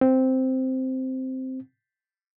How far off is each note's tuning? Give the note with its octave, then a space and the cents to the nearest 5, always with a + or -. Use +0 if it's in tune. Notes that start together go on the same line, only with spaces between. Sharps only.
C4 -5